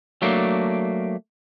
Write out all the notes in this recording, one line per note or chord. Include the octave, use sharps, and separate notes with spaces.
F#3 A3 A#3 D4